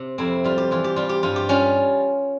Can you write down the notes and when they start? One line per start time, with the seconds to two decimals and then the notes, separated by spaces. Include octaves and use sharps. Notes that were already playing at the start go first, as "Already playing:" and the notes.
Already playing: C3
0.18 F2 C4 E4
0.44 G3 F4
0.58 G4
0.71 E3 F4
0.84 G4
0.96 G3 F4
1.09 G4
1.23 G2 F4
1.36 G4
1.49 G3 C#4 F4